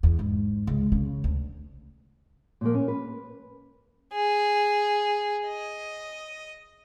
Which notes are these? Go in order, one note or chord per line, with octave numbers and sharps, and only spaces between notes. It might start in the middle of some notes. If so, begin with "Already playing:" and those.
E2
G#2
C#2
C#3
D2
A#2 F3 A#3
C#4
B4
G#4
D#5